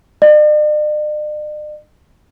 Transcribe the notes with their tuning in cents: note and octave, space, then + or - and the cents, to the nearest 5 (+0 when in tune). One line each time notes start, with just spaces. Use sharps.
D5 +45